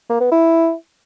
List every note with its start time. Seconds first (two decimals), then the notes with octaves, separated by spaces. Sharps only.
0.09 A#3
0.20 B3
0.31 E4